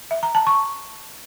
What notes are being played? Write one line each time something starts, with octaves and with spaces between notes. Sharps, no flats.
E5
A#5
A5
C#6